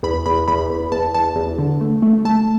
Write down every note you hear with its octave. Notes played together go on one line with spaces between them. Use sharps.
E2 B5
E2 B5
E2 B5
E2
E2 A5
E2 A5
E2
D3
A3
A3
A3 A5